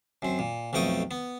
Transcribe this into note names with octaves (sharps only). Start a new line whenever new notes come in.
F#2 C4
A#2
B1 F2 A3 G5 C#6 D#6
B3